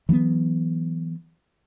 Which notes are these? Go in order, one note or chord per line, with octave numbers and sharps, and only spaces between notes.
E3 F#3 A#3 B3